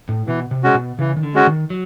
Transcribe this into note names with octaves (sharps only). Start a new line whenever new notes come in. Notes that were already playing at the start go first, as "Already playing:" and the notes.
A2
B2 E3
C3
G#3 C#4 F#4
B2
C#3 E3
D#3
D3
G#3 C#4 F#4
D#3
F#3